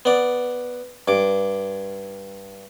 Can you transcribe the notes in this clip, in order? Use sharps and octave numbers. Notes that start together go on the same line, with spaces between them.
B3 D5
G2 D6